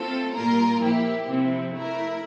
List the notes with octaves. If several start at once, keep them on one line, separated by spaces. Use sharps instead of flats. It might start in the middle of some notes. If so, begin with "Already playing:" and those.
Already playing: A3 C4 F4 A4
A#2 G3 A#3 F4 A#4
F3 A#3 E4 G4
C3 F3 C4 E4
A3 E4 A#4